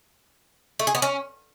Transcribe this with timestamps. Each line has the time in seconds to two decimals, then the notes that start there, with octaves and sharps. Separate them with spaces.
0.79 A3
0.87 G#4
0.95 B3
1.02 C#4